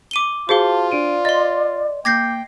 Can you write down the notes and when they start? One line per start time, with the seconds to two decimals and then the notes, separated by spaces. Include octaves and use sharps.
0.11 D6 D#7 G7
0.49 F4 F#4 G#4 C5 F5 A5 G7
0.92 D4 D5 D7 D#7
1.25 D#5 C6 A6
2.05 A#3 G5 D6 G6 G#6 A#6 C7